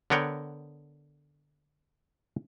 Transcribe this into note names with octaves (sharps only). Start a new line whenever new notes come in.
D3 B3 A#4 C#5 F#5 G5